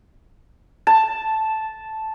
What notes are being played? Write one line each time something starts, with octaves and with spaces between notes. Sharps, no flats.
A5